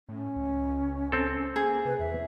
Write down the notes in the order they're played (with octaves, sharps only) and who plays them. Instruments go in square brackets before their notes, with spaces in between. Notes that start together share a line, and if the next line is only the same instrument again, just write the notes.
[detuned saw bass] A2 [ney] C#4
[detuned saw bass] C#2
[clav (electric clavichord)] C4 A4
[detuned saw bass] A#3 [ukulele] G#4
[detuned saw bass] C3 [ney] B4
[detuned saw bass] E2 [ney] E5